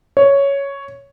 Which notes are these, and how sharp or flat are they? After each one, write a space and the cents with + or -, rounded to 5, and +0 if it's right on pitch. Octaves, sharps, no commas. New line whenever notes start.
C#5 +5